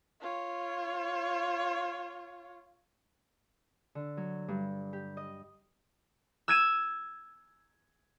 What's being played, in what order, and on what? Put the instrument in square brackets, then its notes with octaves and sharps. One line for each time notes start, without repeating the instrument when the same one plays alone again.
[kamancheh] F4 C#5
[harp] D3
F#3
G2
G4
D#5
E6 G#6 D#7 E7